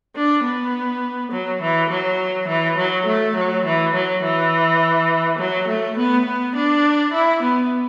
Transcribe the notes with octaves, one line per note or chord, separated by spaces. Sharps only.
D4
B3
F#3
E3
F#3
E3
F#3
A3
F#3
E3
F#3
E3
F#3
A3
B3
B3
D4
E4
B3